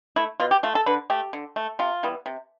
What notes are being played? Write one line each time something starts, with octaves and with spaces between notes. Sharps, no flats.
A3 E4
B2 F4
G4
A3 F4
A4
D3 B4
A3 G4
D3
A3
C3 F4
E3 G3 B3
C3